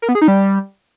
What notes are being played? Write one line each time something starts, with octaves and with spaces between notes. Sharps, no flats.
A#4
B3
G#4
D#4
G3